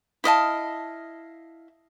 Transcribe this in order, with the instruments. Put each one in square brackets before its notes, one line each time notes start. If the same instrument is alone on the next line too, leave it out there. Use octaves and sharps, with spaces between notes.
[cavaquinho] E4 D#5 F5 A5